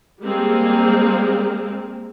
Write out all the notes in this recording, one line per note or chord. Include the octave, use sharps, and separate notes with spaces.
G3 G#3 A#3 C4 G#4